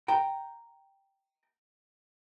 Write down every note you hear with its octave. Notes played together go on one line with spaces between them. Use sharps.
G5 A#5